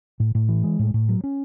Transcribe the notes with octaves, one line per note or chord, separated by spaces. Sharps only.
A2
A2
E3
G#3
A2
A2
F#3
C#4